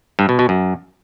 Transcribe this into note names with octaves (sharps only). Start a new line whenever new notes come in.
G2
B2
B2
F#2